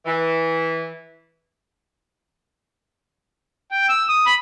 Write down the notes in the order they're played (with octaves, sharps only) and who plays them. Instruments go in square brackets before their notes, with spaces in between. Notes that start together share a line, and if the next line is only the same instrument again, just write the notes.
[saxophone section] E3
[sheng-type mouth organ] G5
E6
D#6
B5